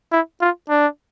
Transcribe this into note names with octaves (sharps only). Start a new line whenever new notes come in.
E4
F4
D4